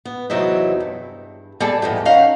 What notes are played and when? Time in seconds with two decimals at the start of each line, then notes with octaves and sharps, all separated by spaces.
0.05 B3
0.30 E2 C3 F#3 D#4 E4
0.80 G2
1.60 G3 G#4 A4 D5
1.82 E2 G#2 B3 G4
2.05 C#4 D#4 F5 F#5